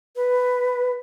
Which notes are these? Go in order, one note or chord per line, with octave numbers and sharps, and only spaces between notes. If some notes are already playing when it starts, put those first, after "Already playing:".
B4